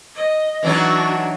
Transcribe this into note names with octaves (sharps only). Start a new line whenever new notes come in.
D#5
E3 F#3 D4 D#4 F#4